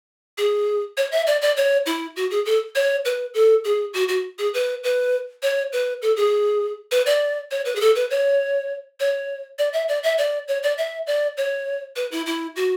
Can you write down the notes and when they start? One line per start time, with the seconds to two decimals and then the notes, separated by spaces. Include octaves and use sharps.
0.38 G#4
0.97 C#5
1.12 E5
1.27 D5
1.42 D5
1.57 C#5
1.86 E4
2.16 F#4
2.31 G#4
2.46 A4
2.75 C#5
3.05 B4
3.34 A4
3.65 G#4
3.94 F#4
4.09 F#4
4.38 G#4
4.54 B4
4.84 B4
5.42 C#5
5.73 B4
6.02 A4
6.17 G#4
6.92 B4
7.06 D5
7.51 C#5
7.65 B4
7.76 G#4
7.81 A4
7.95 B4
8.10 C#5
9.00 C#5
9.59 D5
9.73 E5
9.88 D5
10.03 E5
10.18 D5
10.48 C#5
10.63 D5
10.78 E5
11.07 D5
11.37 C#5
11.96 B4
12.12 E4
12.26 E4
12.56 F#4